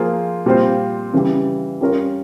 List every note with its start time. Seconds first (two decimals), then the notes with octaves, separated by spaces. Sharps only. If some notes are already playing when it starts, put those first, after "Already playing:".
Already playing: F3 A#3 F4 G#4 C5
0.46 A#2 G3 C4 F4 C5
1.13 C#3 E3 G3
1.81 G3 C#4 F4 A#4 C#5